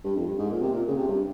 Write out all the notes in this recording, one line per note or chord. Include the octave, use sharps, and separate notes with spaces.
G2
F2
G2
G#2
A#2
C3
A#2
C#3
C3
G2